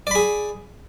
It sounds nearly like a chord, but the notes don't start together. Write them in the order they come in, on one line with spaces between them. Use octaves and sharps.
D5 B5 G#4